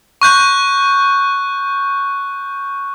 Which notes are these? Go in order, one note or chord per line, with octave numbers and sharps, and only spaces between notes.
C#6 F#6 G6